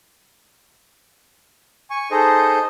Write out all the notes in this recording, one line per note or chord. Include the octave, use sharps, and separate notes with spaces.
G#5 C#6
D#4 G#4 A4 C5 D#5